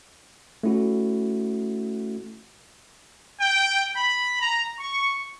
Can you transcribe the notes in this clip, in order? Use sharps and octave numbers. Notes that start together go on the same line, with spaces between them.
A3 C#4 E4 F#4
G5
B5
A#5
C#6